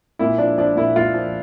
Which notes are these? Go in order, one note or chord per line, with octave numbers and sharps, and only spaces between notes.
A#2 E4
F3 D4
F3 D4
A#2 E4
A#2 F4
F3